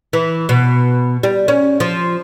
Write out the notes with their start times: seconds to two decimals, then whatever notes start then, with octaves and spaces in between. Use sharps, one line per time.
0.13 E3
0.49 B2
1.23 G3
1.48 C#4
1.80 F3